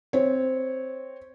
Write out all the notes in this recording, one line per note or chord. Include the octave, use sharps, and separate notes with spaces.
C4 C#5